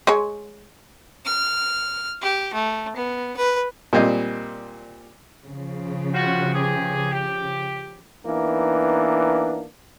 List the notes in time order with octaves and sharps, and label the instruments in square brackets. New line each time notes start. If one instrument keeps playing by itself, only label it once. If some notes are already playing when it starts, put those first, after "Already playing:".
[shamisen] G#3 C#5
[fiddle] F6
G4
A3
B3
B4
[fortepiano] A#2 G3 C4 D#5
[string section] C#3 F3
[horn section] G3 F4 F#4
G2 G4 G#4
G4
[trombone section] E3 A#3 B3 D4 D#4